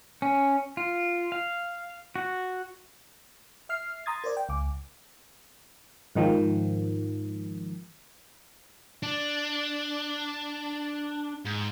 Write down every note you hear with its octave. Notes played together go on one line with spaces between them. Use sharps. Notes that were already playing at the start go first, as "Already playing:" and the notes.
C#4
F4
F5
F#4
E5 F6 C7
A#5 C6 D#6 G#6 A6
A#4 C5 D5
G5
C#2 D6
G#2 D#3 F3
D4
G#2